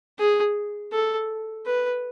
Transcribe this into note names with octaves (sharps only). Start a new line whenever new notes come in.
G#4
A4
B4